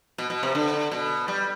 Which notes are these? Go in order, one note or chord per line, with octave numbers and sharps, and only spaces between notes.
B2
B2
C3
D3
B2
G3